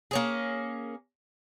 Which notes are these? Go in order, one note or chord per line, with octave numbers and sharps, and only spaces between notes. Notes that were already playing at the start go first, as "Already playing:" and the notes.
A#3 C#4 G#4